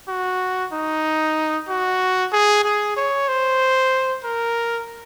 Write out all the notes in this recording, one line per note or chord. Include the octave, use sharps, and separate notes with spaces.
F#4
D#4
F#4
G#4
G#4
C#5
C5
A#4